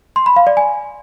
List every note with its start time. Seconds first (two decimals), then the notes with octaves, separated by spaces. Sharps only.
0.16 C6
0.26 B5
0.36 F5
0.47 D5
0.57 G#5